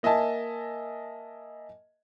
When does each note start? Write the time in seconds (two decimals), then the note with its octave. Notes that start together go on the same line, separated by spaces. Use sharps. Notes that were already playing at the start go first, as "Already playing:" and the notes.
0.03 A#3 D#5 E5 G#5 A5